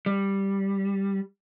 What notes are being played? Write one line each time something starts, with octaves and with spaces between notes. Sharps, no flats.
G3